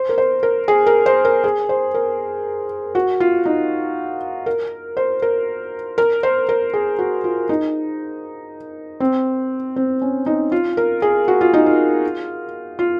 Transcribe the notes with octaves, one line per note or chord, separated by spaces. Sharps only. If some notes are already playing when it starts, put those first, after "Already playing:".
Already playing: C5
A#4
C5
A#4
G#4
A#4
C5
A#4
G#4
C5
A#4
F#4
F4
D#4
A#4
C5
A#4
A#4
C5
A#4
G#4
F#4
F4
D#4
C4
C4
C#4
D#4
F4
A#4
G#4
F#4
F4
D#4
F4
F4